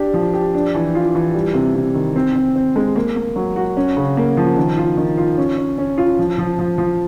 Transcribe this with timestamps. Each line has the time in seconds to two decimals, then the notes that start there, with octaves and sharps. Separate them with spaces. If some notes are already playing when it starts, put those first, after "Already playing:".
Already playing: D4 G4
0.14 F3
0.34 G4
0.55 D4
0.75 E3
0.95 F4
1.15 E3
1.34 G3
1.54 C3
1.75 C3
1.94 D#3
2.16 C4
2.36 C4
2.55 C4
2.76 G#3
2.96 A#3
3.16 A#3
3.36 F#3
3.56 F#4
3.77 C#4
3.97 C#3
4.17 A#3
4.37 F3
4.57 D#3
4.77 F4
4.97 D#3
5.17 F4
5.38 C#4
5.58 C#4
5.78 C#4
5.98 F4
6.19 F3
6.38 F3
6.59 F3
6.78 F3